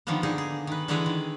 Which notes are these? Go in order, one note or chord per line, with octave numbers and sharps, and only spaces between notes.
D3 D#3 F3 G3 A#3 B3
D3 D#4 G#4
G#4
D#3 B4
D3 E3 G#3 E4 G#4 B4
D#3